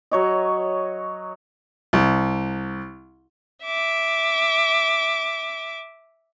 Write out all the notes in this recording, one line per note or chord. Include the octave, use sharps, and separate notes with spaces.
F#3 C#5 D#5
C2
E5 D6